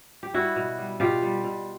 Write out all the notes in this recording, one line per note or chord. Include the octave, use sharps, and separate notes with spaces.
G4
G3 E4 F#4
B2
G3
B2 F4 G4
G3
B2